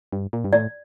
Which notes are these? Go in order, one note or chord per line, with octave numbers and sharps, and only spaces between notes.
G2
A#2
G2
A2 D5